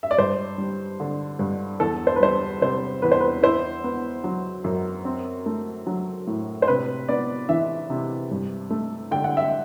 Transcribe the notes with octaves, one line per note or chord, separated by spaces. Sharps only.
E5
D5
G2 C5
G3
D3
G2
E2 A4
C5
B4
G3 C5
C3 C5
E2 B4
C5
B4
E4 C5
B3
F#3
F#2
C4
A3
F#3
A2
C5
C3 B4
B3 D5
E3 E5
C3
G2
A3
D3 G5
F#5
E5